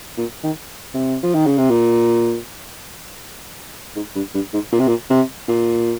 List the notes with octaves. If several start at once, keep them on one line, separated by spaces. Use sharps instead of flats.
A#2
D#3
C3
F3
D#3
C#3
C3
A#2
G#2
G2
G2
G#2
A#2
C3
A#2
C3
A#2